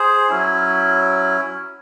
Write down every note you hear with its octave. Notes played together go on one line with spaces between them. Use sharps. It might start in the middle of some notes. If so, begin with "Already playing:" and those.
Already playing: G#4 C5
F#3 C#4 E4